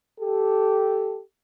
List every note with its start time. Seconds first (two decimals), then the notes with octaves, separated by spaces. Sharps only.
0.20 G4 A4